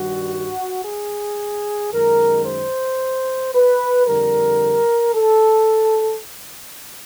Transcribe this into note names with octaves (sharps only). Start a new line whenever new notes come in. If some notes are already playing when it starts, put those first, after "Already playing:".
Already playing: G2 D#3 G3 F#4
G#4
F#2 D#3 G#3 A#4
C5
B4
F2 D3 G3 A#4
A4